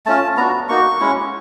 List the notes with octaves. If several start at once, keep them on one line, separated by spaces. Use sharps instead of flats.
A3 C#4 F4 A5
B3 D4 F#4 A#5
A#3 D#4 F#4 C#6
G#3 C#4 E4